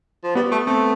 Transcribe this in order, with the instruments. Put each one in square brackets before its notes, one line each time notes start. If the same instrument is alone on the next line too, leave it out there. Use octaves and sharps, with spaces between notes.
[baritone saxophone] F3
[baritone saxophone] G3 [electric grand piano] B3
[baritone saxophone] A3
[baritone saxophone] A3 [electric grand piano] C4